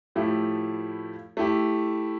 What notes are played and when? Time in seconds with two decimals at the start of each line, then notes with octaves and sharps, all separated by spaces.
0.16 A2 F3 A3 E4 G4
1.37 A3 E4 G4